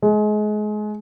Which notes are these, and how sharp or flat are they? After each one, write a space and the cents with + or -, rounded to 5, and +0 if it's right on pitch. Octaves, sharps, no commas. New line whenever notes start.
G#3 +30